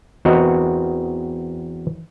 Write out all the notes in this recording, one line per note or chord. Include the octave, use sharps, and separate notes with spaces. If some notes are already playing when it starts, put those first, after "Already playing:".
E2 C4 F#4 A#4 B4 D#5